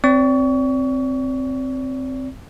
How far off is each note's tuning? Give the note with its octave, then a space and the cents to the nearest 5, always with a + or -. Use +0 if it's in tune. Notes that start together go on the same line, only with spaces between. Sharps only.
C4 +0 D5 -40 C#6 +30